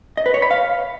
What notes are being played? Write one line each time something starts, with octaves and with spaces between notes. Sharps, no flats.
D#5
B4
C#5
B5
F5